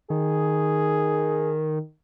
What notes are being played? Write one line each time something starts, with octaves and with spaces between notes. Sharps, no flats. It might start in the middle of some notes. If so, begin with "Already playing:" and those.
D#3 G#4